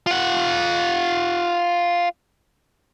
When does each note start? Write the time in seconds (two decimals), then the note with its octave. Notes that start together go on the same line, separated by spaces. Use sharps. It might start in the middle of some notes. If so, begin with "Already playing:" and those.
0.07 F4 F#5